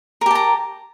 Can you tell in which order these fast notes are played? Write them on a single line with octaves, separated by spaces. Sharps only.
A#4 G4 A5 A#5